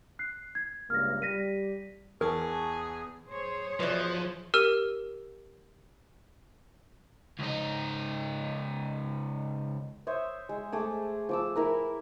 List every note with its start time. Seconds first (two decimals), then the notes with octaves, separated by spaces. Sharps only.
0.19 F#6 C7
0.55 G#6
0.90 C#2 G2 A#3 F6 A#6
1.22 G3 A#6 B6 D#7
2.21 E2 E3 G#4 A#4 G#5 A5 C#6
3.30 G#4 C5 C#5
3.80 B2 E3 F3 B4 D5
4.54 G4 A#4 E6 F6 D#7
7.39 C#2 D#4
10.07 C5 C#5 E5 D#6
10.49 G#3
10.72 A3 G#4 D6
11.29 F3 D6 E6
11.56 E4 A#4 B4